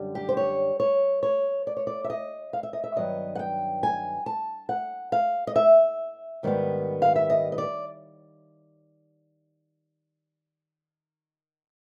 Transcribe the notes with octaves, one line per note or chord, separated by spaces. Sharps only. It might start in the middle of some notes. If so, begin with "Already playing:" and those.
Already playing: F#2 D3 G3
G4
C5
C#5
C#5
C#5
D5
C#5
D5
E5
D#5
F5
E5
D#5
E5
G2 D#3 F#3 B3 D#5
F#5
G5
G#5
A5
F#5
F5
D#5
E5
G#2 D#3 G3 B3
F5
E5
D#5
D#5
D5